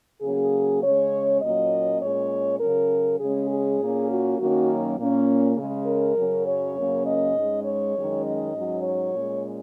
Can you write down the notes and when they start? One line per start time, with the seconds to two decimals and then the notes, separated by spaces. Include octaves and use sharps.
0.22 C#3 F#3 A#3 C#4 G#4
0.81 C#3 G#3 C#4 C#5
1.41 A#2 F#3 A#3 C#4 D#5
2.01 A#2 G#3 C#4 C#5
2.60 C#3 F#3 C#4 A#4
3.20 C#3 G#3 C#4 G#4
3.49 G#4
3.79 A#2 A#3 C#4
4.09 F#4
4.38 F#2 D#3 F#3 A#3 C#4 F#4
4.97 A#2 A#3 C#4
5.57 C#3 G#3 C#4
5.86 A#4
6.16 F#2 C#3 F#3 C#4
6.46 C#5
6.75 F#2 C#3 A#3 C#4
7.05 D#5
7.35 G#2 G#3 C#4
7.64 C#5
7.94 F#2 D#3 G#3 C#4
8.24 D#5
8.53 G#2 F#3 C#4
8.83 C#5
9.13 A#2 G#3 C#4